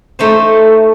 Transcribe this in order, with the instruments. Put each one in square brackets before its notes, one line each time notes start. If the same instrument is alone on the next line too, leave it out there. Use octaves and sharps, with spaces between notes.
[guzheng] A3 D#4 C5